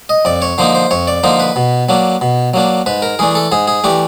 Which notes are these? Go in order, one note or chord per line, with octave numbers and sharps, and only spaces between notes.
D#5
F2 D5
C#5
D3 F3 A#3 D#4 C5
C5
F2 C#5
D5
D3 F3 A#3 D#4 C5
B4
B2
F#3 A#3 D4
B2
F#3 A#3 D4
G#2 B4
A#4
E3 A3 D4 G#4
A4
G#2 G#4
G#4
E3 A3 D4 G4